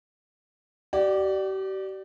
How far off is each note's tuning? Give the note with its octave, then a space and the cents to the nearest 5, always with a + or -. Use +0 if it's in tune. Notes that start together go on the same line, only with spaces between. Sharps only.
G4 -40 D5 +10